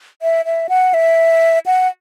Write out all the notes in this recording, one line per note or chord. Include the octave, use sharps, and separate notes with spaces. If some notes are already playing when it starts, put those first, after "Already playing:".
E5
E5
F#5
E5
F#5